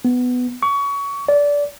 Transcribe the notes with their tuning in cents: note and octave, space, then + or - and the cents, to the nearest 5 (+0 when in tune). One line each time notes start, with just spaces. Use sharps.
B3 +10
C#6 +25
D5 -20